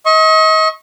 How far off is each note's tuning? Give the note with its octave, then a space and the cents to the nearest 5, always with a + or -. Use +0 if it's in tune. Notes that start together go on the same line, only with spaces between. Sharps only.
D#5 +35 C#6 -30